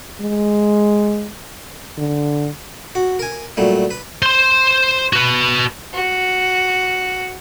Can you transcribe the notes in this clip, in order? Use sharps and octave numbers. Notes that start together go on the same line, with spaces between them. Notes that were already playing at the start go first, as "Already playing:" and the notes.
G#3
D3
F#4
A#4 G#5
A#2 F#3 G3 A3
B4
C5 C6
F#4 B4
F#4